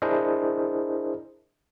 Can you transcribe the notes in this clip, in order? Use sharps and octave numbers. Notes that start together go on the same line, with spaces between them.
D4 E4 G#4 A#4 C5 D#5